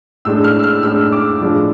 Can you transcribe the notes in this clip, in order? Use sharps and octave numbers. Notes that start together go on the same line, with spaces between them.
A2 G#3 D4 E6
F6
E6
F6
A2 G#3 D4 E6
D6
A2 F3 G#3 D4 F4